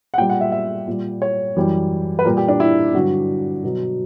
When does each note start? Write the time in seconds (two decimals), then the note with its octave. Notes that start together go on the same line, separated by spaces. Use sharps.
0.14 F#5
0.18 A#2 G5
0.21 G3
0.29 F#5
0.41 E5
0.52 E5
0.88 A#2 G3
1.22 C#5
1.56 F#2 E3 G3
2.19 B4
2.25 A#2 G3 A#4
2.37 G4
2.48 D4
2.60 E4
2.94 G2 D3 F#3 F#4
3.64 B2 F#3